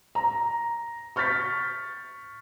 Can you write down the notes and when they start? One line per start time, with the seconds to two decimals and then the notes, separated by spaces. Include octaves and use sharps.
0.15 A#5
1.16 C#6 F6 G6 A6 B6